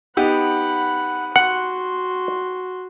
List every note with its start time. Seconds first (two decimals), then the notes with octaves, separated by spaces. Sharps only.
0.17 B3 D#4 G4 F#5 B5
1.36 F#4 F#5 C6